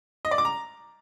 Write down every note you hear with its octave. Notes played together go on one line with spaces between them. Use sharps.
D#5
D5
D6
A#5